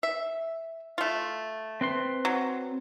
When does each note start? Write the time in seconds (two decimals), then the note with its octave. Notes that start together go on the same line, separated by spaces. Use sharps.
0.03 E5
0.98 A3 F4
1.81 C4 B4 C6
2.25 F#3